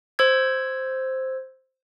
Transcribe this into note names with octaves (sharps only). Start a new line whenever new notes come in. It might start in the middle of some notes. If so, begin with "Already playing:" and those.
C5 E6 G#6